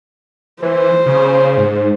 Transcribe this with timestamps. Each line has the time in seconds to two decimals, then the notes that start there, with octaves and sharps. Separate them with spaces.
0.62 E3 C5
1.06 C#3
1.57 G#2